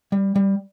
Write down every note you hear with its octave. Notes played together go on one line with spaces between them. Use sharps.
G3
G3